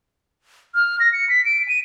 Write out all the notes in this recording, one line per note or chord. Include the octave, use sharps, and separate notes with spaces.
F6
A#6
C#7
B6
D7
D#7